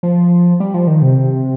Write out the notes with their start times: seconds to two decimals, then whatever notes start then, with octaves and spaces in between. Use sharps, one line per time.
0.03 F3
0.60 G3
0.74 F3
0.87 D#3
1.02 C3